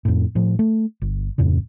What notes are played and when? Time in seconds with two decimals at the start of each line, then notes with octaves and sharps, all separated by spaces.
0.05 F2 A2
0.35 A2 F3
0.59 A3
1.02 G1
1.38 D1 F2 A2 C#3